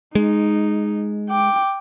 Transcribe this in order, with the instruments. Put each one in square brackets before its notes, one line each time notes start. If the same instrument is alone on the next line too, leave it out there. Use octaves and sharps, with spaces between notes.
[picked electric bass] G#3 [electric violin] D#4
[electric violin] G5 D6